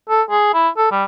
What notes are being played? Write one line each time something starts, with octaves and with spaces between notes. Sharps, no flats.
A4
G#4
E4
A4
G3